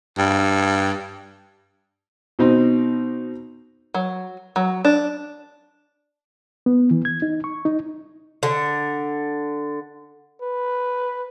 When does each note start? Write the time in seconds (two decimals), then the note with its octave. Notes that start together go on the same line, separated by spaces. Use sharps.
0.18 G2
2.39 B2 C4 D#4
3.94 F#3
4.56 F#3
4.85 D4
6.66 B3
6.91 E3
7.05 G#6
7.22 D#4
7.44 C#6
7.65 D#4
8.43 D3
10.42 B4